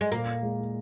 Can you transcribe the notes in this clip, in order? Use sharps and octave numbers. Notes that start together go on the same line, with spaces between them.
G#3
A#2 A#3
G#3